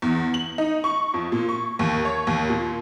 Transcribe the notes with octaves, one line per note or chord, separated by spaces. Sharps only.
E2
F#7
D#4
C#6
F2
A#2
C#6
D#2
C#5
D#2
A#2